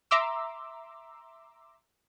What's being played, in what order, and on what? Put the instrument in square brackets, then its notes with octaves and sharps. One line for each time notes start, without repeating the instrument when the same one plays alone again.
[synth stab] E5 A#5 C6 D6 E6